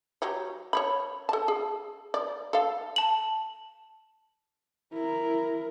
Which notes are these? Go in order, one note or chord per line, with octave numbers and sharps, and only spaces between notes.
F#3 G4 C#5
C#5 D5 B5
A4 A5
G#4
D5
A4 F5
A5 F#7
E4 A#4